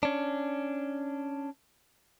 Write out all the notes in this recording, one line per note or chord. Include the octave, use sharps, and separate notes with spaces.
C#4 D4